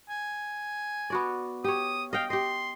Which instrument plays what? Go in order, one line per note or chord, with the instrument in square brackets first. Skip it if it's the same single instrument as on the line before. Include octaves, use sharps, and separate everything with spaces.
[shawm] G#5
[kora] B3 F#4 D5
[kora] G4 C#5 [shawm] D#6
[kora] D#5 G5 [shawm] F5
[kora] G4 D#5 [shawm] C6